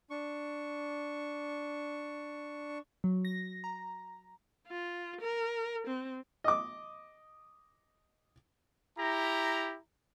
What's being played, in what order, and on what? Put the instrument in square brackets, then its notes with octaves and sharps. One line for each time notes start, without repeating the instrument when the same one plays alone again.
[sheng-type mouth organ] D4 C#6
[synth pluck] F#3
A#6
A#5
[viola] F4
A#4
C4
[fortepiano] D#5 D6
[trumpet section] E4 G4 A#5